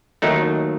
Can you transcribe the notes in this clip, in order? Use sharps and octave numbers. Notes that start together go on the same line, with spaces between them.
D#2 D#3 F#3 A3 D#4